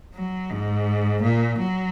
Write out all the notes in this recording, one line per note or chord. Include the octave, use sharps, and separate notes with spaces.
F#3
G#2
A#2
F#3